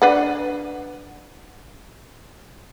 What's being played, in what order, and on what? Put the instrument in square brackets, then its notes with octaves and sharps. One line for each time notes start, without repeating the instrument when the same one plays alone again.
[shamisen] D4 B4 F#5